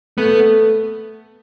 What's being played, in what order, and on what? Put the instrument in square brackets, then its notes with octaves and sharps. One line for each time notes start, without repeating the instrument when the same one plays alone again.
[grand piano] A3 [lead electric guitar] B3